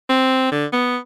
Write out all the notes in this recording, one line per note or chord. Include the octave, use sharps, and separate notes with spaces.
C4
D3
B3